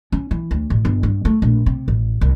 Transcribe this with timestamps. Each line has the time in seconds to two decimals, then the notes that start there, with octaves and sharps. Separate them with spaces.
0.12 C#4
0.31 E3
0.51 D2
0.70 A1
0.85 G1
1.03 G2
1.25 A3
1.42 A#1
1.66 C3
1.88 A1
2.21 C2